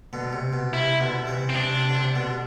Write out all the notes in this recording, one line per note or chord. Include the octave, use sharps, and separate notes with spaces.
B2 D3
C3
B2
C3 E4
B2 D3
C3 E3
C4
C3 D4
C3
D3
C3
B2 D3